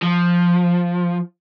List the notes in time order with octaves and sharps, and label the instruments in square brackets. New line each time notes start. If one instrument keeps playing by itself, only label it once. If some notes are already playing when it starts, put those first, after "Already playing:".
[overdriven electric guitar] F3